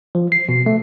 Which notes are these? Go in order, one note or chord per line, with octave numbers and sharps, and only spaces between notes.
F3
C7
B2
A3